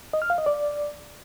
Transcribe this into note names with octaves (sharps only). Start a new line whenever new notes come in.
D#5
F6
F5
D#5
D5